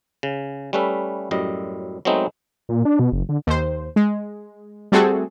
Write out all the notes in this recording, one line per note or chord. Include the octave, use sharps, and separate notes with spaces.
C#3
G3 A3 C#4 B4 E5
F#2 A2 G3 D#5
F#3 G#3 A3 B3 C4 D#4
A#2
D4
B2
F#1
D3
D#2 C5
G#3
G3 A3 C4 F#4 G#4 A4